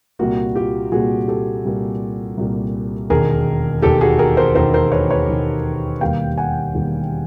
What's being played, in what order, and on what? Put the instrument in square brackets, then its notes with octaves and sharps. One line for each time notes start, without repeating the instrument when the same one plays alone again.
[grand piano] C2 A#2 G3 A#3 F#4
F4 G4
C2 A#2 G3 A#3 F#4 G#4
G4 A4
C2 A#2 G3 A#3
C2 A#2 G3 A#3
E1 D#2 D#3 G#4 A#4
E1 D#2 D#3 G4 A4
F#4 G#4
G#4 A#4
A#4 C5
E1 D#2 D#3 A#4 C5
A#4 C5
B4 C#5
B4 C#5
E1 D#2 D#3
E1 D#2 D#3 G3 A#3 F5 G5
F#5 G#5
E1 D#2 D#3 G3 A#3